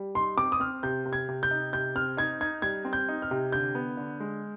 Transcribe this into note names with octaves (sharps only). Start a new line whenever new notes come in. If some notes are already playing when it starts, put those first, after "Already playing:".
Already playing: G3
D#4 C6
C4 D6
D#6
C4 F6
C3 G6
C3
G#6
C3
G6
D#4
C3 G6
C4 F6
D#4 G#6
D#4 G#6
G3 G#6
C4
G6
D#4
F6
C3
D3 G6
B3
D3
G#3